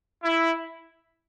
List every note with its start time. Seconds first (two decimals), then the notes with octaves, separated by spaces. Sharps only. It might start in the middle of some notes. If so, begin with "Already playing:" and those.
0.23 E4